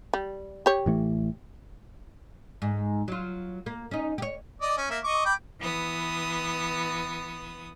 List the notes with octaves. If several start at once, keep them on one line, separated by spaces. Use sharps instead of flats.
G3
G4 C#5
A1 E3 A3
G#2
F#3 F4
A#3
C#4 D#4
G4 C#5
D5 D#5
C#4
A#3 E5
D#5 C#6 D6
G5 B5 D6
E3 B3 D#6